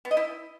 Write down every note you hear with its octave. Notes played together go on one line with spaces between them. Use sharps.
B3
D#5
E4